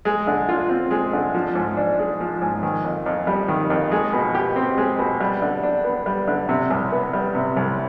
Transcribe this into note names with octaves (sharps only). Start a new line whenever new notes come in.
G#3
D3
F4
C4
G#3
D3
F3
G#2
D4
G#3
F3
G#2
D#3
F2
F2
G3
D#3
F2
G#3
B2
G4
C4
G#3
B2
G3
D3
D4
B3
G3
D3
C3
C2
B3
G3
C3
C2